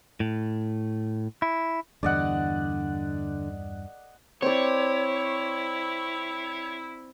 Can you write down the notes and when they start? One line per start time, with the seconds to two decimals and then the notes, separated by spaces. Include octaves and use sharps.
0.20 A2
1.42 E4
2.03 E2 G2 D3 D5 D#5 F#5
4.42 C4 E4 C#5 D5